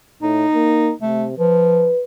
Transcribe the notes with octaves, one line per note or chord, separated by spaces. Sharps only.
A2 D#4
A#3
C3 A3
F3 B4